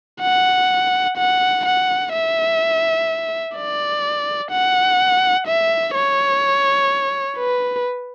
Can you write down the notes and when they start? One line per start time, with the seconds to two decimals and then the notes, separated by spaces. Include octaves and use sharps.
0.21 F#5
1.17 F#5
1.65 F#5
2.13 E5
3.55 D5
4.51 F#5
5.47 E5
5.94 C#5
7.38 B4